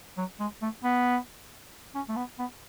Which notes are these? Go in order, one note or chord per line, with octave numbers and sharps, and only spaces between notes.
F#3
G#3
A3
B3
C#4
A3
B3
B3